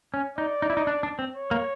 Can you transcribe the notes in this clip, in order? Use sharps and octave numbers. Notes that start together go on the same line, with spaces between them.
C#4
D#4 D5
D#4
E4
D#4
D4
D4
C4
C#5
A#3